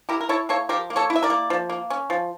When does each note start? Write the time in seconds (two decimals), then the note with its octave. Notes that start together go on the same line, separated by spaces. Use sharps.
0.09 E4 G4 A#4
0.21 A#4
0.29 E4 A4 C#5
0.49 A#3 A4 C#5
0.69 F3 G4 A#4
0.90 A#3
0.96 A4 C#5
1.10 E4
1.16 E5
1.23 A#4 D5
1.30 A#3
1.50 F3
1.70 A#3
1.90 C#4
2.10 F3